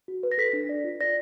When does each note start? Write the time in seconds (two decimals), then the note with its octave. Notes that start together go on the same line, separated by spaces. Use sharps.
0.08 F#4
0.23 B4
0.32 A#6
0.38 A4 B6
0.53 D4
0.69 D5
0.84 F4
1.01 D5 A#6